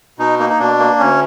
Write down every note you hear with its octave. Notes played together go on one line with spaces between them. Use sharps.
B2 D#4
A#3 D#4
D#4
B2 D4
A#3
D2 C#4